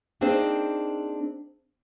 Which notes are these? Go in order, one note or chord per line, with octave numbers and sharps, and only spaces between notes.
A#3 C4 D4 D#4 G#4 C5